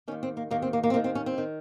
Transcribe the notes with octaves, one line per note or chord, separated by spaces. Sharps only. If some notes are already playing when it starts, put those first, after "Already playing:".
D#2 D#3 C#4
C4
A#3
D#2 D#3 A#3
C4
A#3
A#3
C4
D#2 D#3 A#3
C4
C#4
C4
D#3